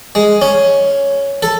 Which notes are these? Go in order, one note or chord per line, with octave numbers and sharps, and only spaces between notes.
G#3
C#4
A4